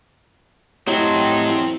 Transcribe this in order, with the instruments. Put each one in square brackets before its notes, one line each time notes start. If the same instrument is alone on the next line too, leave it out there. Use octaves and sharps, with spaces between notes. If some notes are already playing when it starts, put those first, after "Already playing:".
[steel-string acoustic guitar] A2 [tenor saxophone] F#3 [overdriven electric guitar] C4 A4 [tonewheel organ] G4 D#5 C6